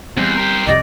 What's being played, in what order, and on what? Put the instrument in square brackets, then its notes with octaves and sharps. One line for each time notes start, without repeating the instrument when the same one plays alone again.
[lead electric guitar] E2 [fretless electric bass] G3 C4 [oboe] C5
[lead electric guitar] G4 A#4
[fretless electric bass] C2 F2 C3 [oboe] D5 [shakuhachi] D#5